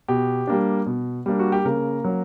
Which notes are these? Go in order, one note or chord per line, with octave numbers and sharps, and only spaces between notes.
B2 G4
G3 A#3 D4
B2
G3 A#3 D4
F#4
G4
C#3 A#3 A#4
F#3 C#4